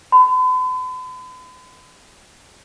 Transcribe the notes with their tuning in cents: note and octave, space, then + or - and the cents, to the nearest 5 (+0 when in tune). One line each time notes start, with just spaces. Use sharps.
B5 +45